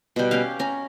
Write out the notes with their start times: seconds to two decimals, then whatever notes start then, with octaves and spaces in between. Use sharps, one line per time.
0.16 B2 G3
0.31 C#4 G4 F5
0.59 C#4 A#5